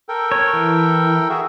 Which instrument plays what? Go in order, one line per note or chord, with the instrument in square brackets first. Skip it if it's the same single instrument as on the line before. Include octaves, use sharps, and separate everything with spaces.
[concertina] A4 A#4 G5
[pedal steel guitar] C#5
E3
[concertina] F#4 G#4 E5